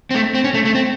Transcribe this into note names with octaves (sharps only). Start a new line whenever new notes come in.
C4
A3
C4
C#4
A3
A3
C4